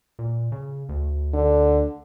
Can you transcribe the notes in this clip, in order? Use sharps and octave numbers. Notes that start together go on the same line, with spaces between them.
A#2
C#3
D2
D3